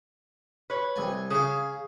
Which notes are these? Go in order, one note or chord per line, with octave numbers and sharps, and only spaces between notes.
B4 C#5
C2 G#5
C#3 G#4 F5